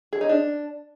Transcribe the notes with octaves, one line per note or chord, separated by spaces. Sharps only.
G#4
D#4
D4